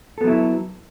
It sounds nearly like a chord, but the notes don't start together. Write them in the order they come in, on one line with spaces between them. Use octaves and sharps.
A4 B3 F#3 E4